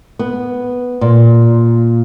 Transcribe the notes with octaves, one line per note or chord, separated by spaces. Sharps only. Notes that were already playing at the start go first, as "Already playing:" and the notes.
B3
A#2